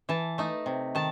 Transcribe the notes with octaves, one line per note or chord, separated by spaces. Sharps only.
E3 A5
A3 D#4
C3
D#3 A5